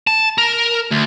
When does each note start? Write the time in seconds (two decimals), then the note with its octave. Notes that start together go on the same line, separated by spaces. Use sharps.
0.07 A5
0.38 A#4
0.91 D2